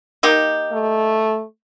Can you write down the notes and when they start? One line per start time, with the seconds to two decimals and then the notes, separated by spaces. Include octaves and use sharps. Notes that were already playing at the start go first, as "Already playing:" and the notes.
0.23 A#3 D#4 G4
0.72 A3